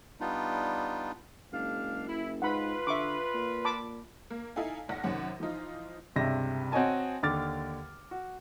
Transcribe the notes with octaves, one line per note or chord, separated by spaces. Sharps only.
G3 B3 D4 D#4 F4
F#1 G#3 D4 F5
E4
G#2 F4 B4 F#5 B5
D3 E5 C#6 D6
A#2
A5 B5 D6
A#3
D#4 E4 A4 F5 G#5
F1 B1 F#5 A#6
F#2 C3 D#3 C#4 F#5
E3 F3 D#4 F4
C#2 G2 C3 E5 A#6
C4 F#4 C#5 D#5 G#5 A5
D#2 D3 D6 F6 A6
F#4